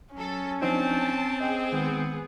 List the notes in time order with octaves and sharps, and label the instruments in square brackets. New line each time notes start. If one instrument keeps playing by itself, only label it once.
[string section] F#3 A4 [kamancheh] C#4
[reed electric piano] F3 D4 D#4 [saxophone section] C4 [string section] A5
[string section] G#4 [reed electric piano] D#5 G5
[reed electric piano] D#3 G#3 G6 [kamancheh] B3